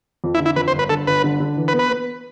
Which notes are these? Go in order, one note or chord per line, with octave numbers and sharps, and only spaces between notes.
F2
E4
D3
E4
F2 B4
C5
G1
B4
D3 A4
G1 B4
D3
D3
E3
B4
B3
B4
B3